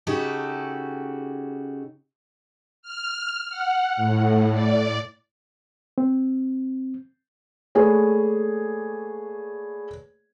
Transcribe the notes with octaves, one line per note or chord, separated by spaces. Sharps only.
C#3 D#4 F#4 G4 A4
F6
F#5
A2
D5
C4
A3 A#3 G#4 B4 C#5 D5